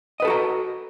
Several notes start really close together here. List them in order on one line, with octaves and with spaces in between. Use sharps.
D#5 B4 A4 F#4 A#5